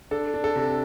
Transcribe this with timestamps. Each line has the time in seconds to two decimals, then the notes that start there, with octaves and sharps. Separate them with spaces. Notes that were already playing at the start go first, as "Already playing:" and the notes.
0.11 D4 A4
0.34 D4
0.44 A4
0.56 C3